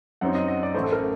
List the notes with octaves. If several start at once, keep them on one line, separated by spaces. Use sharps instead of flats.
F#2 F#3 C4 D#4 F#5
D#5
D#5
D5
A1 A2 A3 C5
A4
A#4